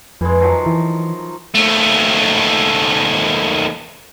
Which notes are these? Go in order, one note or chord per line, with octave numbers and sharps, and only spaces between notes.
F2 E3 G#3
D#3 F3 F#3
E3
D#2 A3